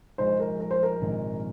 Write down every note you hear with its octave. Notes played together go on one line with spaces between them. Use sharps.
A#1 A#2 G#3 D#4 C5
A#4
A#4
C5
A#4
A#1 G#2 D#3 G#3 C4